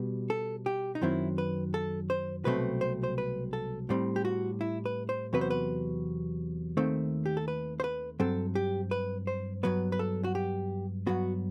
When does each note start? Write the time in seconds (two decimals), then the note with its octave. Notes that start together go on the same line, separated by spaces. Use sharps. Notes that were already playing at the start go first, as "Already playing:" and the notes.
Already playing: B2 G3 B3
0.30 A4
0.66 G4
0.95 D#4
1.02 F#2 D#3 F#3 C4 E4
1.38 B4
1.74 A4
2.10 C5
2.45 C2 B2 F#3 A3 C4 B4
2.81 C5
3.03 C5
3.18 B4
3.53 A4
3.89 A2 G3 C4
4.16 G4
4.25 F#4
4.61 E4
4.86 B4
5.09 C5
5.33 E2 C3 F#3 B3 B4
5.41 C5
5.50 B4
6.77 D#2 D#3 A3 C4
7.26 G4
7.37 A4
7.48 B4
7.80 C5
7.84 B4
8.20 G2 F#3 C4 A4
8.55 G4
8.91 B4
9.27 C5
9.63 G2 F#3 B3 B4
9.92 B4
9.99 A4
10.24 F#4
10.35 G4
11.07 G2 F#3 B3 F#4